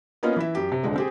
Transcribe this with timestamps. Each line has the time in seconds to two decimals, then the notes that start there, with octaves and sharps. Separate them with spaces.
0.23 A#3 B3 C#4 D#4 F4
0.36 E3 E4 E5
0.55 F#2 G4
0.72 C3
0.83 D#1 D3 G#3
0.96 C4 G4 G#4